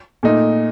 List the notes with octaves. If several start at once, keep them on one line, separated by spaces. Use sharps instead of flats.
A#2 A3 D#4